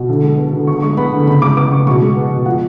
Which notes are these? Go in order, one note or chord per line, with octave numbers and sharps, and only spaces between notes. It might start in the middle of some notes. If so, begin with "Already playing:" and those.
Already playing: B2
D3
G#3
B3
D3
D3 C#6
G#3 C#6
B3 B5
D3
C#3 B5
G#3 D6
B3 D6
C#3 C#6
B2 C#6
G#3
B3
B2
F3 F#5